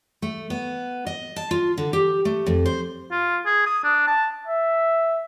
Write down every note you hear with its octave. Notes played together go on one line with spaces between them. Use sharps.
A3
B3
D#5
A5
F4
D3
G4
A3
F2
C5
F4
G#4
D#6
D4
A5
E5